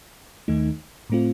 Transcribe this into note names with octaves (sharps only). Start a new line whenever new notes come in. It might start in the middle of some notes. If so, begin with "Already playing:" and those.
D#2 D#3 A3 D#4
A2 A3 C4 F4